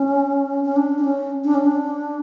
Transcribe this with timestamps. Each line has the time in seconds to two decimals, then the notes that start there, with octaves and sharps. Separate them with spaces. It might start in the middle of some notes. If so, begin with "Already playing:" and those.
Already playing: C#4
0.65 C#4
0.76 D4
0.98 D4
1.04 C#4
1.44 D4
1.54 C#4
1.65 D4